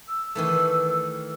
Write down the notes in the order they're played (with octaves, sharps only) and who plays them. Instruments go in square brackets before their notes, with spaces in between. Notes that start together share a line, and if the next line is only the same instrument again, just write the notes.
[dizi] E6
[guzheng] D#3 E3 A3